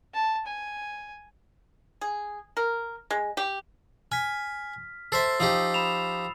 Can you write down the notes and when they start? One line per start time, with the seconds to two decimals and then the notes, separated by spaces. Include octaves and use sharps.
0.14 A5
0.47 G#5
2.01 G#4
2.57 A#4
3.11 G#3
3.37 G4
4.12 G#5 F6 B6
5.12 A4 C5 E5 E6 A6 C7
5.40 F3 D#4 G4 D#6 E6 C7
5.74 B5 E7 F7